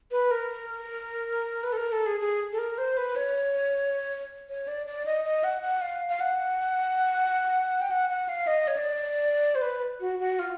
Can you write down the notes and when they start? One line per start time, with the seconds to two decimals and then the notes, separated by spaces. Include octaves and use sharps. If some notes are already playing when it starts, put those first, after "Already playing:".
0.11 B4
0.31 A#4
1.63 B4
1.72 A4
1.77 A#4
1.92 A4
2.06 G#4
2.20 G#4
2.52 A4
2.58 A#4
2.78 C5
2.97 B4
3.16 C#5
4.49 C#5
4.68 D5
4.86 D5
5.06 D#5
5.24 D#5
5.44 F#5
5.62 F#5
5.81 F5
6.09 F5
6.20 F#5
7.81 G5
7.91 F#5
8.10 F#5
8.29 F5
8.47 D#5
8.68 C#5
8.77 D5
9.55 C5
9.62 B4
10.00 F#4
10.19 F#4
10.39 F4